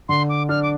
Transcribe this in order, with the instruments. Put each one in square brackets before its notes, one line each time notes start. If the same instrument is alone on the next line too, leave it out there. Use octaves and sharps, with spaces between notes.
[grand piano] D3 [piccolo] C6
[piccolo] D6
[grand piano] D4 [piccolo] F6
[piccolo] D6